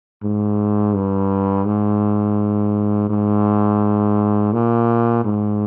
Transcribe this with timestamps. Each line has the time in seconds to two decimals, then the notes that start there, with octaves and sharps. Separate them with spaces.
0.22 G#2
0.95 G2
1.66 G#2
3.09 G#2
4.53 A#2
5.24 G#2